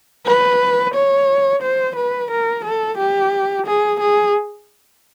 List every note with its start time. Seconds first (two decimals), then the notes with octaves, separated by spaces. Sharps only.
0.26 B4
0.95 C#5
1.63 C5
1.96 B4
2.31 A#4
2.65 A4
2.99 G4
3.67 G#4
4.01 G#4